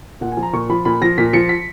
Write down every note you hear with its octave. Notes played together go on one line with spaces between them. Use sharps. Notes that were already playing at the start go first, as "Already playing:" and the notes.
A#2 F#5
G#5
F3
A#5
A#2 C#6
F3 B5
A#2 B5
F3 A#6
A#2 B6
F3 C#7
B6